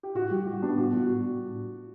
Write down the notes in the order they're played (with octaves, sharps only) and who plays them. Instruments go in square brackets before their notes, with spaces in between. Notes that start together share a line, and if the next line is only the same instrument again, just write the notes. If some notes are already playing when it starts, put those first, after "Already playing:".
[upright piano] G4
[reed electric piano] A2 [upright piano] F#4
[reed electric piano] G3 [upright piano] G4
[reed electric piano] A2 [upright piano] F#4
[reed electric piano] B3 [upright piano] D4
[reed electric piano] A2 [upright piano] F#4
[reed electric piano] G3 [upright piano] F#4
[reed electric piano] A2